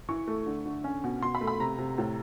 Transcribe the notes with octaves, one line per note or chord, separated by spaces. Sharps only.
E3 C#6
A3
D3
D3
C#4
B2
B2 C6
B5
A3
B5
C3 A#5
C3
A2